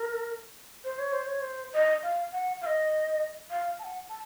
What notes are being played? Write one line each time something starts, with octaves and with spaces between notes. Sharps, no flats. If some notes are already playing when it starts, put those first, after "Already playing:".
Already playing: A#4
C5
C#5
C5
C#5
C5
D#5
F5
F#5
F5
D#5
F5
A5
F#5
A5